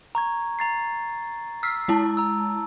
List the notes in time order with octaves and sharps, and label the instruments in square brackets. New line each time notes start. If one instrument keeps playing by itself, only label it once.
[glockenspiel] A#5 C#6 G#6
A#5 A6 C7
[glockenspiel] E6 [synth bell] F6 B6 C7
[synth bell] G#3 E4 A5
[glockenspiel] A#5 E6